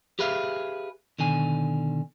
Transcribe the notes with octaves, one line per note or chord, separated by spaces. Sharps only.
G4 G#4 B4 E5 F5
B2 D3 D#3 G#5